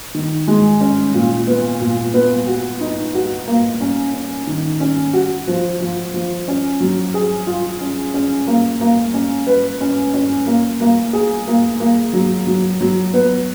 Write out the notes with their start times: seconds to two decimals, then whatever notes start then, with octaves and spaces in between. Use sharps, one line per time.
0.14 D#3
0.48 G#3
0.81 C#4
1.14 A#2
1.47 B3
1.80 A#2
2.14 B3
2.47 F#4
2.81 D#4
3.14 F#4
3.47 A#3
3.81 C#4
4.14 C#4
4.47 D#3
4.80 C#4
5.13 F#4
5.48 F3
5.80 F3
6.14 F3
6.48 C#4
6.80 F#3
7.14 G#4
7.47 F4
7.81 C#4
8.14 C#4
8.47 A#3
8.81 A#3
9.14 C#4
9.47 B4
9.81 C#4
10.14 C#4
10.47 A#3
10.81 A#3
11.13 G#4
11.47 A#3
11.80 A#3
12.13 F#3
12.47 F#3
12.81 F#3
13.14 B3